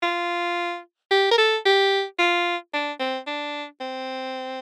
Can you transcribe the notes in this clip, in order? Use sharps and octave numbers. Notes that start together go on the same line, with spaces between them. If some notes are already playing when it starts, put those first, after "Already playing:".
F4
G4
A#4
A4
G4
F4
D4
C4
D4
C4